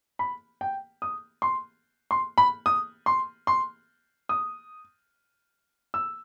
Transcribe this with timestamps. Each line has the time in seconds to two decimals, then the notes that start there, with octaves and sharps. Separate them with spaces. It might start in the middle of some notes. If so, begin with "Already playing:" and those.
0.19 B5
0.61 G5
1.02 D#6
1.42 C6
2.11 C6
2.38 B5
2.66 D#6
3.06 C6
3.47 C6
4.29 D#6
5.94 E6